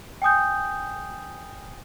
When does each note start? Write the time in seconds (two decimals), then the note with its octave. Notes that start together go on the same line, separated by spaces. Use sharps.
0.22 G5 G#5 D#6 G6